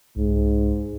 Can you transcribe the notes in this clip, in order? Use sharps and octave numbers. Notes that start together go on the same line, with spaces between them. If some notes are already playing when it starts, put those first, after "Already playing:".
C2 G#2